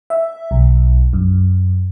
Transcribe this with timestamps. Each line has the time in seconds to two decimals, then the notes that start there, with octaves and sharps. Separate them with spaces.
0.10 E5
0.51 B1
1.13 F#2